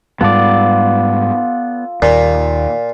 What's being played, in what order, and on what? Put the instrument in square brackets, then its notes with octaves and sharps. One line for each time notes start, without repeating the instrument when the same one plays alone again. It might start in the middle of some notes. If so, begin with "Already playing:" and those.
[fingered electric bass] G#2 G3 G#3 [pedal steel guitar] B3 D5 [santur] F4 A4 A5
[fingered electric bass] D#2 [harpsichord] A#2